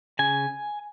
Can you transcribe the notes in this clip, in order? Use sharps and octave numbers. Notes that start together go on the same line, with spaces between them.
C#3 G#5